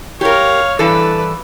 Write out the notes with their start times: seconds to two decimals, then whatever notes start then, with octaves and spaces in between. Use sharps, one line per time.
0.21 G4 A#4 C#5 F5
0.79 G2 E3 A4 B4 D5